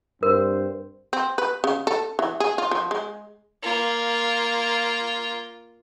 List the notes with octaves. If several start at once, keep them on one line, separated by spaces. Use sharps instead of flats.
G2 C4 A#4 C5
C4
B4
C#3
A4
E3
G#4
F4
F3
G#3
A#3 F4